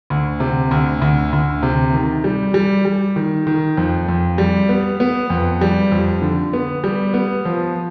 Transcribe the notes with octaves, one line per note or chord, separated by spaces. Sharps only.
D2
C3
D2
D2
D2
C3
D#3
G3
G3
G3
D#3
D#3
F2
F2
G3
B3
B3
F2
G3
F2
D3
B3
G3
B3
F3